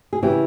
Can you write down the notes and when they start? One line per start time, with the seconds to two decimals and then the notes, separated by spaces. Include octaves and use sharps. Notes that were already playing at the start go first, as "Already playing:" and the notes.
0.13 G#4
0.23 C#3 E3 G4